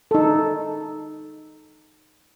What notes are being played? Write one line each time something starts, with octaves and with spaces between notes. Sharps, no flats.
D#4 A4